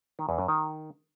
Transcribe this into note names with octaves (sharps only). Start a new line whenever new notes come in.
D#3
E2
F#2
D#3